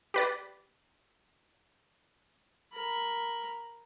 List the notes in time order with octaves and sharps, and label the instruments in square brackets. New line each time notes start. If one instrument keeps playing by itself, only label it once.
[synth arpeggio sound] G4 B4 D5
[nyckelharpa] A#4 B5